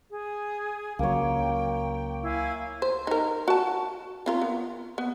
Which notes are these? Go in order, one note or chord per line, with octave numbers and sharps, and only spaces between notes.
G#4
C#2 F#3 A#3 C#5 G5
E4 F5 G#5
C5
D#4 A#4
F#4 A5
C4 F4 A#4
B3
B3